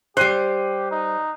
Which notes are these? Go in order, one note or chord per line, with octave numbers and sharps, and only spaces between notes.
G3 G4 C5 F#6 C7 D#7
D#4